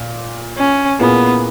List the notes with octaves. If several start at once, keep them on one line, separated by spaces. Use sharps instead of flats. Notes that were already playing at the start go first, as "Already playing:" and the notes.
Already playing: A#2
C#4
A#2 A#3 B3 E4 G#4 B4